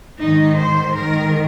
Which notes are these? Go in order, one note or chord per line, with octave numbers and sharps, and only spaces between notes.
G#2 D#3 D#4
C5
G#2 D#3 A#4